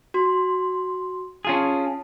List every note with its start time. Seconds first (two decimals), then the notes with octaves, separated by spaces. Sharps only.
0.14 F#4 C6
1.45 C#4 F4 G#4 G#5 A5